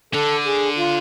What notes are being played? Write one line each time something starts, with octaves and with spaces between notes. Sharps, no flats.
D3 A4
G#4
F4